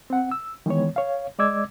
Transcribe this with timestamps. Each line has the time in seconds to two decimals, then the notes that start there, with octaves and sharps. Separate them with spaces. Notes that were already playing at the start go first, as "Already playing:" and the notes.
0.10 C4 F#5
0.31 E6
0.66 D#3 E3 G#3 B3 C#5
0.96 C#5 F5
1.39 G#3 D5 D#5 D6 E6 G#6